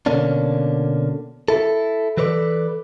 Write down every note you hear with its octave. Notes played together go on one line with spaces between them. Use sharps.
B2 D3 A#3 C#4 D4
E4 A4
E3 A4 B4 C#5 D5